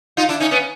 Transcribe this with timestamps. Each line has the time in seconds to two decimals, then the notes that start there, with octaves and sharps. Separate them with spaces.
0.17 D#4 F4
0.29 D4 E4
0.40 C#4 D#4
0.51 B3 C#4